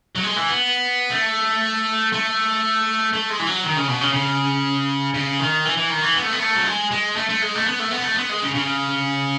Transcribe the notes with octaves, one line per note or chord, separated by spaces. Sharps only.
F#3
G#3
E3
B3
A3
A3
A3
G#3
E3
F#3
D#3
C#3
B2
C#3
C#3
C#3
D#3
E3
E3
D#3
E3
B3
A3
B3
A3
F#3
G#3
G#3
A3
A3
G#3
A3
B3
A3
B3
A3
B3
G#3
C#3
C#3